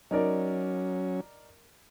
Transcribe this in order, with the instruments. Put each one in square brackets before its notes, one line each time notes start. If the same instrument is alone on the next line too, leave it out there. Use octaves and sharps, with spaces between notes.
[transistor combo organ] F#3 C#4 [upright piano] D#4 A#4 D5